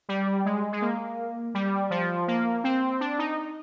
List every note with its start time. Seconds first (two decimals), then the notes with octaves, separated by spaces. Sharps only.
0.09 G3
0.45 G#3
0.73 G#3
0.82 A#3
1.54 G3
1.90 F3
2.28 A#3
2.64 C4
3.00 D4
3.19 D#4